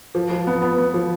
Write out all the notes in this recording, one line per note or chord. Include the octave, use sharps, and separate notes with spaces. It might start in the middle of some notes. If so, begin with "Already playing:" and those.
F3
F3
B3
B3
B3
F3